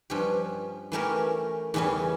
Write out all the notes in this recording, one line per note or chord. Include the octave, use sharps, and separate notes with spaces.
G2 F3 C#4 G4
E3 A3 C#4 G4 A#4
E2 C#3 E3 G3 C#4